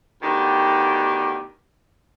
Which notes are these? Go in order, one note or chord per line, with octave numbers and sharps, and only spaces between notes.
D2 B2 D#3 D4 G4